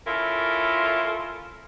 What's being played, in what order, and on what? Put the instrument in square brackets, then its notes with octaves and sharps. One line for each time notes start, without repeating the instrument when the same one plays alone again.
[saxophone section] C#4 E4 F4 A4 A#4